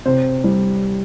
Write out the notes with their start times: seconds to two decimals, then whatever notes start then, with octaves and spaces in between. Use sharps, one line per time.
0.06 C3 C5
0.44 G3